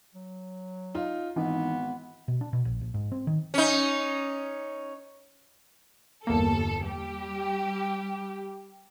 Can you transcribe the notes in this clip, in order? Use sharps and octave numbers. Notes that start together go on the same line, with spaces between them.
F#3
D#4 F4
G#1 E3 B3 D#4
B2
D4
B2
A#1
A#1
G#2
C4
D#3
C#4 D#4
G1 E2 A#3 A4
G3 G4